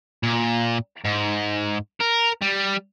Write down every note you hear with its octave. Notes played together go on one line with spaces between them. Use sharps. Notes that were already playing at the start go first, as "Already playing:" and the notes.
A#2
G#2
A#4
G3